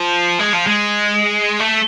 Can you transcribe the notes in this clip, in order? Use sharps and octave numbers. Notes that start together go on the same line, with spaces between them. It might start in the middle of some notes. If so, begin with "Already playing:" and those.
Already playing: F3
G#3
F3
G#3
A3